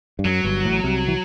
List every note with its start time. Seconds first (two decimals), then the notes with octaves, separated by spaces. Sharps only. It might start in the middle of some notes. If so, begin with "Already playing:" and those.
0.19 G2
0.25 F#2 F#3
0.44 G1 G2
0.65 A1 A2
0.84 C2 C3
1.08 E3